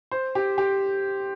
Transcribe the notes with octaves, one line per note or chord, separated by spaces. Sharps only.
C5
G4
G4